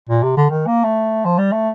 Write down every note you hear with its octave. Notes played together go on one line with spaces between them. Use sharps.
A#2
C3
D3
D#3
A#3
A3
F3
G3
A3